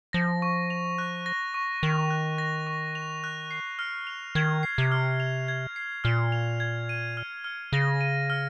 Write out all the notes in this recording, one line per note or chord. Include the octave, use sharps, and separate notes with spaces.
F3 A#6
C#6
F7
F#6
A#6
C#6
D#3 F7
F#6
A#6
C#6
F7
F#6
C7
F6
F7
D#3 G#6
C7
C3
F6
F7
G#6
C7
A#2 F6
F7
G#6
D#7
F6
F6
C#3 A#6
D#7
F6